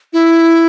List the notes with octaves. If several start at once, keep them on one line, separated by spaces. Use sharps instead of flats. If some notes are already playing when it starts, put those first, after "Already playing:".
E4